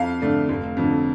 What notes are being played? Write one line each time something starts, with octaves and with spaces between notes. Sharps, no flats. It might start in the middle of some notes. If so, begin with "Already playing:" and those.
Already playing: F2 F5
D3 A3 D4
F1
F2 D3